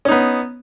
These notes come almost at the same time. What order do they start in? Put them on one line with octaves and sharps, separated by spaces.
C#4 D#4 B3